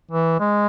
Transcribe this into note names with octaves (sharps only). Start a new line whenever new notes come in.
E3
G#3